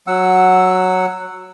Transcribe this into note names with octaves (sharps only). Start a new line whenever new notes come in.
F#3 F#5 E6